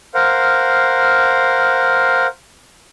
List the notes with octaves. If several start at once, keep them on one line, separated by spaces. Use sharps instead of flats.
A#4 C5 F5 F#5